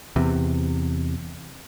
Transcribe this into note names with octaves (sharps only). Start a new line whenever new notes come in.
E2 C3